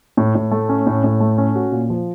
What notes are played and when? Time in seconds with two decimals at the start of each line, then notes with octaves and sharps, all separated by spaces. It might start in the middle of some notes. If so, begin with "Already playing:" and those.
0.17 A2
0.35 A2
0.51 A3
0.69 C#4
0.87 A2
1.04 A2
1.20 A3
1.38 C#4
1.55 F#4
1.72 A#2
1.90 F3